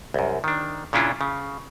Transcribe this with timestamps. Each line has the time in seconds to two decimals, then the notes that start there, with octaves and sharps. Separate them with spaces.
0.14 C2 F#2
0.44 D#3 D4
0.93 A#2 C#3 C#4 D4 E4 F4
1.21 C#3